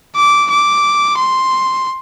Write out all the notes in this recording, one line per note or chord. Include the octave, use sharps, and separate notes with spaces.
D6
D6
C6